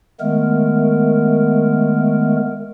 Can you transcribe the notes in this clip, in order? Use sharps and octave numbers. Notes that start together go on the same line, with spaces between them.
D#3 G#3 A3 B3 A#4